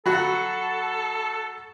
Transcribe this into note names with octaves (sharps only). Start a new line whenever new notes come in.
F#3 F#4 A4 F#5 B5